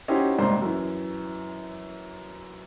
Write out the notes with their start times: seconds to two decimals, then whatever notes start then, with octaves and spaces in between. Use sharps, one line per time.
0.08 C#4 D#4 E4 F#4 G4 C5
0.38 F#1 G#2 C3 G3 C5
0.62 F#2 E3